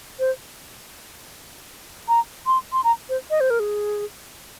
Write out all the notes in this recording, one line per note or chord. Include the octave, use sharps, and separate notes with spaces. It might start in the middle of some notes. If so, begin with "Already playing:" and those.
C5
A#5
C6
C6
A#5
C5
D#5
C5
A#4
G#4